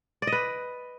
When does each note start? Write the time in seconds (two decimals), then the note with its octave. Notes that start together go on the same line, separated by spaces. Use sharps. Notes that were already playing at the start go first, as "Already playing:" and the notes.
0.22 D5
0.27 D#5
0.32 B4